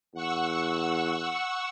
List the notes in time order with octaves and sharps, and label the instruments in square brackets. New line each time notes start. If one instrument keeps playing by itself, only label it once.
[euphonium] E2 [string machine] F#5 C#6 E6